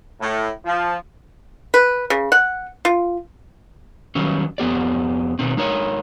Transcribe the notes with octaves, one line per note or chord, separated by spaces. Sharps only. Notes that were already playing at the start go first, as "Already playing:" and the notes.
A2
F3
B4
C#3
F#5
F4
D#3 F#3 G3 C#4
F2 B3 G4 D5
B2 D#3 C4
G#3 D#4 A#4 C#5